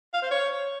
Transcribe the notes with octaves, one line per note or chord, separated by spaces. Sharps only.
F5
C5
C#5